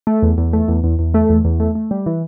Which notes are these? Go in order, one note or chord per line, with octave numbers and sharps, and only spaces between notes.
A3
E2
E2
A3
E2
E2
E2
A3
E2
E2
A3
A3
G3
E3